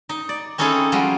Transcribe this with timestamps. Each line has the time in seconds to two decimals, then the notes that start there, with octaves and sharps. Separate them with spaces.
0.09 D#4
0.29 D5
0.58 C4 C#4 D#4 E4 G#4 A4
0.92 F3 G3 G#3 F4 F#4